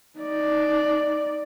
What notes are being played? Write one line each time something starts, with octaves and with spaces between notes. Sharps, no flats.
D#4 D5